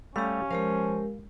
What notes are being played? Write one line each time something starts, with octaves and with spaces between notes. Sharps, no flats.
G3 A3 C#4 G4 F5
F3 G#3 G4 A#4 F5